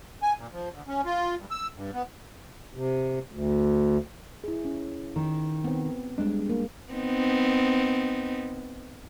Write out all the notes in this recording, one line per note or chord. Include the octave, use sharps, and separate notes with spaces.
G#5
A#2
F3
D2
C#4
F4
G2
E6
G2
B3
C3
D2
E4 G#4
C#4
D#3
B3 C4
G3 G#3 D4
A#3
B3 C4 D#4